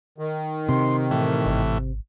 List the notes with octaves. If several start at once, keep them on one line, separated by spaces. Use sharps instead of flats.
D#3
C3 C6
A2 E3
G#1